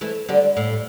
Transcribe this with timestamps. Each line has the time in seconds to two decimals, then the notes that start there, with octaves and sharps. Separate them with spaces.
0.01 E3 A3
0.29 D3 G3
0.57 A2